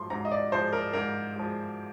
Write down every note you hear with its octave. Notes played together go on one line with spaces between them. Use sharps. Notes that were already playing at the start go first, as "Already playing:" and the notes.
Already playing: G#2 F3 G#3 C6
G#2 A#5
D#5
D5
F3 G#3 C5
A#4
G#2 A#4
F3 G#3